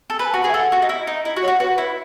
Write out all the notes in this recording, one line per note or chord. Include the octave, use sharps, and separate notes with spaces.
A4
B4 B5
G#5
A5
F#4
G#4 G#5
E5
A4 F#5
F#4
D#4
E4
D#4
E4 D#5
F#4
C#5
F#4
F#4 B4
E4